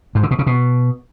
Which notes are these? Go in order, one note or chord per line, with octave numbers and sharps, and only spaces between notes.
G#2
D3
B2
C#3
B2